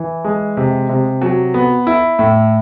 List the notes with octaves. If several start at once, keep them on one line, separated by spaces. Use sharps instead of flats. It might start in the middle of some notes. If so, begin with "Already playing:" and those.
Already playing: E3
G#3
C3
C3
F#3
B3
E4
A2